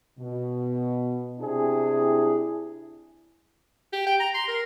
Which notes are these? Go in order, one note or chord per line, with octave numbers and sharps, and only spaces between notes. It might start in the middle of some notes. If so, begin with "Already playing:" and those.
B2
C3 D4 E4 G#4
G4
G5
A#5
C6
A#4